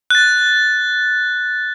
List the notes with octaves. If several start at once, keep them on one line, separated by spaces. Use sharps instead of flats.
F#6 A6